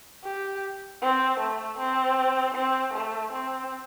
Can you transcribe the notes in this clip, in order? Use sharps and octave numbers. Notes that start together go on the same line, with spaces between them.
G4
C4
A3
C4
C4
A3
C4